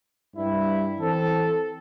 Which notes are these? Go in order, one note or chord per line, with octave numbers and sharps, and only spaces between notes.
G2 G3 E4
E3 C4 A4